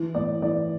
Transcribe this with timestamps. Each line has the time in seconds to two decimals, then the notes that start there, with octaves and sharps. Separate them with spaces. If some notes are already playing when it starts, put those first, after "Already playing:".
Already playing: E3
0.15 A2 D5
0.41 E3 D5